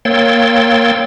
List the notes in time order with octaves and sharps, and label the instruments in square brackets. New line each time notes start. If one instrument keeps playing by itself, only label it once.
[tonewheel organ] A#3 C#5 G5 C6 E6 A6